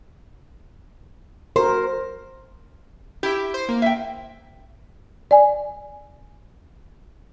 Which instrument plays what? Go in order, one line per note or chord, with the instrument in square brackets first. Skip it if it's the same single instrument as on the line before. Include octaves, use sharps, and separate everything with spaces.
[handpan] F#4 A#4 [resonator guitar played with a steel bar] C5
[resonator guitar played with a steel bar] E4 [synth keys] G4 E5
[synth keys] C5
A#3
[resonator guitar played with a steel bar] E5 G5
[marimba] D5 G#5